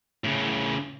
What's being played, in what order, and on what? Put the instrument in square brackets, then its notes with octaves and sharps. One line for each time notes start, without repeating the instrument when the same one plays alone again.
[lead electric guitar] A2 C#3